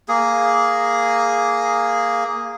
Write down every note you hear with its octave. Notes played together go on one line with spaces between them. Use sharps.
A#3 G#4